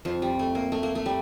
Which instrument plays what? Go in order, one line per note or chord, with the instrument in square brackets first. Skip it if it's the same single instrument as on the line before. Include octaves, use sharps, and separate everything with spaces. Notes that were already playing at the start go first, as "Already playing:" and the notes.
[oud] F2 [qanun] F3
[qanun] G3
A3
A#3
A3
A#3
A3
G3